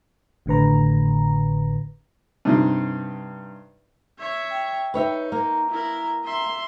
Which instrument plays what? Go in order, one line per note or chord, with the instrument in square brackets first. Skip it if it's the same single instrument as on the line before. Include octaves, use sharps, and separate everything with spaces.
[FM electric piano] G#1 A2 D3 B4 A#5
[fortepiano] G2 C3 D#4
[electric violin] C#5 E5
[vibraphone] G5
[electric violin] D#4 [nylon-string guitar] B4 C#5 E5
[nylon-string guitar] A#3 [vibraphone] A#5
[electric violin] E4 A#4
E5 C6